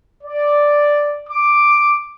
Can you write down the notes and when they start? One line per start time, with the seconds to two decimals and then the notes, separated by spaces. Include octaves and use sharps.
0.24 D5
1.29 D6